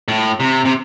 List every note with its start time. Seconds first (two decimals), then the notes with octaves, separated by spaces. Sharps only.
0.08 A2
0.40 C3
0.65 C3